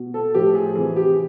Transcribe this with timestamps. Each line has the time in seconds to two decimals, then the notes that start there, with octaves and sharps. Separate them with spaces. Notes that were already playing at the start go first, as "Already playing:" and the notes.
Already playing: B2
0.14 A4
0.34 A2 F3 G4
0.55 G#4
0.76 C3 E3 G#4
0.96 G4